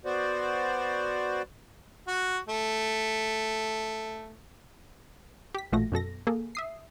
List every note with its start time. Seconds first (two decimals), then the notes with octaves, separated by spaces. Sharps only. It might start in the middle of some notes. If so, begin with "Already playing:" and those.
0.05 B3 F#4 C5 D5
2.07 F#4
2.49 A3
5.55 G4 B6
5.72 A1 A#2 F3 A3 F#4 A#6
5.92 F#2 B2 A4 A#6
6.27 A#3 G#4 A4
6.55 E5 D#6 C7